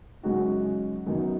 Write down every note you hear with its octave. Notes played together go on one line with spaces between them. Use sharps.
F#2 C#3 G#3 D#4 F#4
F#2 D#3 F#3 B3 D#4